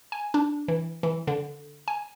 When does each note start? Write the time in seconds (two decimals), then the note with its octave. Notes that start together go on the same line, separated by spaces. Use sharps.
0.12 G#5
0.34 D4
0.68 E3
1.03 E3
1.27 D3
1.88 G#5